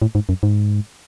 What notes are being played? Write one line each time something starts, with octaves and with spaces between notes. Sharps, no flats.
A2
G#2
F#2
G#2